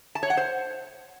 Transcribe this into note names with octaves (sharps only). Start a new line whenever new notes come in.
A5
C#5
F#5
C5